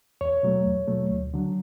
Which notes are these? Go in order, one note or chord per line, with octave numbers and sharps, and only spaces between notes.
E2 C#5
B2 F#3 A3
E2
B2 F#3 A3
D2
D3 F#3